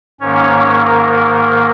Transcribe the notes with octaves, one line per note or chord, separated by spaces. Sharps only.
G#2 D#3 A#3 C#4 C#5
A#3 A#4